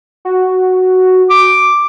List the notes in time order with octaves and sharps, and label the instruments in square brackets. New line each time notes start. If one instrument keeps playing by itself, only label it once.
[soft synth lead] F#4
[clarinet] D6